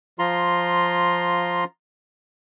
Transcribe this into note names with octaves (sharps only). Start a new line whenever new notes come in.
F3 F4 A#5 C6